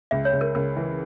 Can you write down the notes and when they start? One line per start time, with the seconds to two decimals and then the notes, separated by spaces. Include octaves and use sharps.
0.11 C#2 E5
0.25 C#5
0.33 C#2
0.41 A#4
0.55 C#2 A#4
0.77 E3